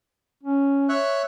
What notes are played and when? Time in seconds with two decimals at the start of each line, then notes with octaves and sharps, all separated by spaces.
0.43 C#4
0.89 C#5 E5 F#6